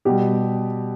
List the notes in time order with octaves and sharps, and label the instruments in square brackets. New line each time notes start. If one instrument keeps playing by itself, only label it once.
[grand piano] B2 G3 G4